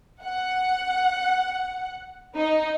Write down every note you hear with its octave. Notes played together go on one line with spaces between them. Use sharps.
F#5
D#4